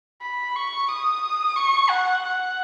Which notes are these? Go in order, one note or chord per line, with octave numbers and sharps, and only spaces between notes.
B5
C#6
D#6
C#6
F#5
F#5